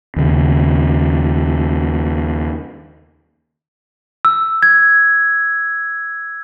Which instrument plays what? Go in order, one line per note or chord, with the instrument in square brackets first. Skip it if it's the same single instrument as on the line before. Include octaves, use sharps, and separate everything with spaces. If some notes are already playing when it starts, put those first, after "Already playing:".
[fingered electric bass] D#2 C#3
[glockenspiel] E6
G#6